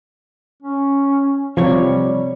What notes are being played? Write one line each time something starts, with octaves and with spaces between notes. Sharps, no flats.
C#4
C3 F3 G3 C#5